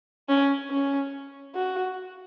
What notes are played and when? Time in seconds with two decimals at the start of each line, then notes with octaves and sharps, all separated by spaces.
0.29 C#4
0.71 C#4
1.55 F#4